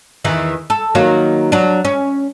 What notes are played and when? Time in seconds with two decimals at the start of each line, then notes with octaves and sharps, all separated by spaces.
0.25 E2 D#3 E3
0.70 A4
0.95 D#3 F#3 A#3
1.52 F#3 D4
1.85 C#4